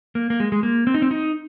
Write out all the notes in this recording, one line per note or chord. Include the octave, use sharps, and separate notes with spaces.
A#3
A#3
G#3
G#3
A#3
C4
D#4
C4
D#4